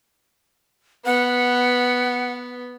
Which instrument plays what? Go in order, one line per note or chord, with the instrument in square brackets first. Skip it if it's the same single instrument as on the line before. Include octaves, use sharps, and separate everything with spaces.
[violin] B3 [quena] F#5